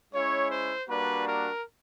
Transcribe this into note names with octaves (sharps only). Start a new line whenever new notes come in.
G#3 C#4 E4 C#5
C5
G3 A#3 D4 F#4 B4
A#4